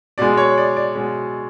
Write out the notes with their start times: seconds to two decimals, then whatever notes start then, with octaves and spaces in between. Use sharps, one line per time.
0.18 B2 G#3 D5
0.37 C#5
0.58 D5
0.76 D5
0.95 B2 G#3